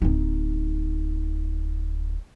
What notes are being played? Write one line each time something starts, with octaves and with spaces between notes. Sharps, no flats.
D1 D#4